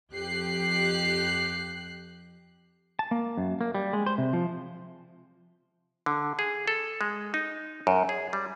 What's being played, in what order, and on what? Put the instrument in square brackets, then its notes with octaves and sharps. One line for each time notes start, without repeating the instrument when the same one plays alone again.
[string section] F2 G4 F#6 C7
[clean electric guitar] A5
A#3
F#2
A#3
G3
G#3
C5
C3
F3
[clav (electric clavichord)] D3
G#4
A4
G#3
D#4
F#2
G#4
G3